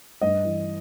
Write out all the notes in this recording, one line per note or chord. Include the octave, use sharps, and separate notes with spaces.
G2 D#5
E3